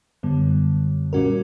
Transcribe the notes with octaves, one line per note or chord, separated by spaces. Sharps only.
F#2 D3 G3 B3
A#2 G3 C#4 F#4 A#4